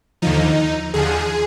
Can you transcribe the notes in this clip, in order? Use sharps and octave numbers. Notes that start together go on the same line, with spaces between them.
D#2 D3 F3 D#4
D#2 D3 F3 G#4